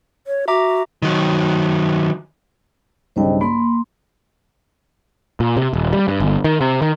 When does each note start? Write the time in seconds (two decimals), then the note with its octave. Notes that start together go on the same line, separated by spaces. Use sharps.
0.27 C#5
0.48 F#4 E5 A#5 D6
1.02 D#3 F#3
3.16 B1 G2 C#3 C5 D#5 G5
3.41 A#3 B5 C6
5.40 A#2
5.57 C3
5.73 D#1
5.93 G3
6.08 G2
6.20 G1
6.44 D#3
6.61 C3
6.82 D#3